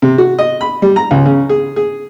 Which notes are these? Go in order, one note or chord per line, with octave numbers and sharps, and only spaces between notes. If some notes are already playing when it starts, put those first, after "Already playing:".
C3
F#4
D#5
B5
G3
A#5
C#2
C#3
G#4
G#4